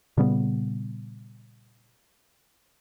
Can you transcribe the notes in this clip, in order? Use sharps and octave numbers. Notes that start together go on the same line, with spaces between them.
A#2 C#3 G3 B3